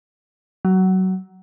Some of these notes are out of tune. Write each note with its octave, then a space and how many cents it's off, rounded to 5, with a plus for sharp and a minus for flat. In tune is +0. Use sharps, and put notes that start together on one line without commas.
F#3 +20